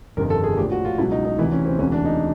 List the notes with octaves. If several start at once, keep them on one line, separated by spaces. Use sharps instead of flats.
G1 F2 C3 D#3 A#4
A4
G#4
A#1 A2 F3 G4
F#4
F4
C#2 B2 F#3 E4
D#4
D#4
D2 C3 E3 E4
C#4
C4
E1 D2 C3 E3 C#4
D4
D#4